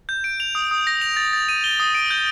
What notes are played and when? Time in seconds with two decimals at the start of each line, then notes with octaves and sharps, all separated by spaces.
0.09 G6
0.24 D7
0.40 F7
0.55 D#6
0.71 D#6
0.87 A#6
1.01 F7
1.17 A6
1.33 A6
1.49 D#7
1.64 G7
1.80 D#6
1.95 D7
2.10 G6